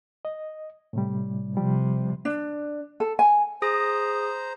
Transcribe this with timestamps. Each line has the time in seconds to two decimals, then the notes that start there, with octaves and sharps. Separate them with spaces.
0.25 D#5
0.93 A2 C3 G3
1.57 C3 F3 G3
2.25 D4
3.00 A4
3.19 G#5
3.62 G#4 C5 A#5 D#6 A#6